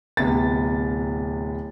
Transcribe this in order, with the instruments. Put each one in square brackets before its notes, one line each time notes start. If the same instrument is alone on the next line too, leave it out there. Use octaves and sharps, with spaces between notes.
[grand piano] D1 C3 B3 A6